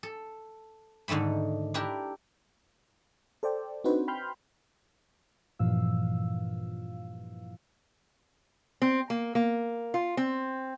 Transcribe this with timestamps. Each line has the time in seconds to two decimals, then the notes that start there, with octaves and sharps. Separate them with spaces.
0.03 A4
1.08 G#2 D3 D#3 A3 B5
1.74 D4 E4 G4 A#4
3.43 A4 C5 D5 G5
3.84 C4 D4 D#4 F#4 B4 C5
4.08 G5 B5 C6 F6 G6
5.59 G2 A#2 E3 F3 F5 E6
8.82 C4
9.10 A#3
9.35 A#3
9.94 F4
10.17 C4